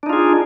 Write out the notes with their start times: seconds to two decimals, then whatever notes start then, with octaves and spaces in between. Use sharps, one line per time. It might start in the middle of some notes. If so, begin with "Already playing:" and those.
0.03 D4
0.06 D#4
0.10 F4
0.13 G#4